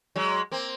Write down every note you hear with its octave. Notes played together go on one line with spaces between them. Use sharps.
F#3 G#3
A#3 C4